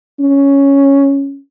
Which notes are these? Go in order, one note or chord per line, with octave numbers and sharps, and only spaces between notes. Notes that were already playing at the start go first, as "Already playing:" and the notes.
C#4